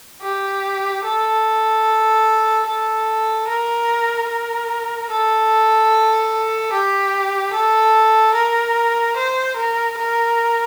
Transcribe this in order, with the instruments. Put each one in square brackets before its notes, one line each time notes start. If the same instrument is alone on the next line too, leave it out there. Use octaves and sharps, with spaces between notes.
[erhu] G4
A4
A4
A#4
A#4
A4
G4
A4
A#4
C5
A#4
A#4